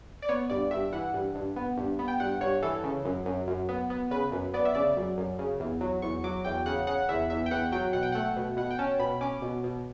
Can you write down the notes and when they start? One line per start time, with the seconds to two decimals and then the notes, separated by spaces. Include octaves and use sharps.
0.22 D5
0.29 B3 C#5
0.50 G2 D5
0.71 G2 E5
0.93 E3 F#5
1.14 G2
1.35 G2
1.56 B3
1.77 G2
1.99 B3
2.08 G5
2.20 G2 F#5
2.41 G2 C#5
2.62 E3 A4
2.84 C#3
3.05 F#2
3.26 F#2
3.47 F#2
3.69 B3
3.90 B3
4.11 C#3 B4
4.32 F#2
4.54 B3 D5
4.65 E5
4.75 C#3 D5
4.96 F#2
5.18 F#2
5.39 C#3
5.60 E2
5.81 F#3
6.02 E2 C#6
6.24 F#3 D6
6.45 E2 G5
6.66 C#3 F#5
6.87 C#3 F#5
7.09 E2 E5
7.30 E2 E5
7.46 G5
7.51 E2 F#5
7.72 F#3 G5
7.93 B2 F#5
8.03 G5
8.12 A3 F#5
8.36 B2
8.57 B2 F#5
8.71 G5
8.79 C#4 A5
8.99 B2 B5
9.21 C#4 D6
9.42 B2
9.63 B2